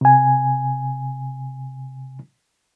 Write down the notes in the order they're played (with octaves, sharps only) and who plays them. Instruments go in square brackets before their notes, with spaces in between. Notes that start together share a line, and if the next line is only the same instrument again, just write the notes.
[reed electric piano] C3 G#5